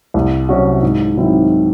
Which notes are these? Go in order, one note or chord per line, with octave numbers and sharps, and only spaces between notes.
C2
C3 F#3 C#4 F#4
G#2
D#3 F#3 C4 E4